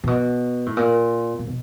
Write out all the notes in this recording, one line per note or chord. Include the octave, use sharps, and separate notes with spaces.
A#2
B2
A2
A#2
A#2
B2